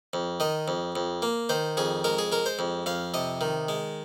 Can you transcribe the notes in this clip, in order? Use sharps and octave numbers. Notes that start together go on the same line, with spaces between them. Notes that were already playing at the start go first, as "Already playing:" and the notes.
F2
D#3 D#5
F2
F2
A#3
D#3 C5
F2 G#4
G#3 A#4
G#4
G#3 A#4
C5
F2
F2 F5
C3 D#5
D#3
G#3